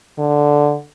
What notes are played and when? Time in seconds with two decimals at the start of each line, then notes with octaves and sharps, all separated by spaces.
0.18 D3